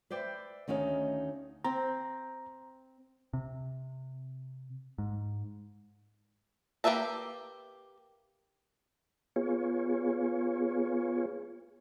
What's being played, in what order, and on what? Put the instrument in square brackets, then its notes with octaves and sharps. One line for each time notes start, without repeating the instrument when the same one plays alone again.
[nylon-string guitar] B4 C5 D5 E5 G5
D2 D#3 C#4 D#4 F5
[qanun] C4 [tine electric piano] A#5
[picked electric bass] C3
G#2
[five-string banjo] A#3 G4 B4 E5 A5
[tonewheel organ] B3 F4 G#4 C#5